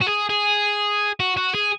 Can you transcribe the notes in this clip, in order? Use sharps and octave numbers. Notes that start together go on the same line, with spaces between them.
F#4
G#4
G#4
F#4
F#4
G#4